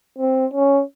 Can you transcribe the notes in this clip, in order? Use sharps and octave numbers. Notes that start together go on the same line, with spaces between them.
C4
C#4